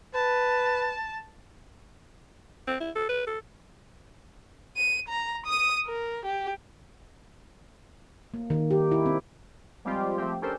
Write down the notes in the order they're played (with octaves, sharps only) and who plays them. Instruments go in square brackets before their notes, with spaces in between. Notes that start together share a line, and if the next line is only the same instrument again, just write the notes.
[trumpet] B4 [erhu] A5
[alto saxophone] C4
E4
A4
B4
A4
[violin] D#7
A#5
D#6 D#7
A#4
G4
[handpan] A#3
D#3
G4
E4
C4
[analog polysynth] F3 G3 G#3 C4 F4 G4
F3 A3 C4 G4
C#4 D4 G4 A4 A#4 C5